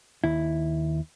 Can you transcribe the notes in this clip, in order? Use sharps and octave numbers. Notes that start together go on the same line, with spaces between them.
D#2 E4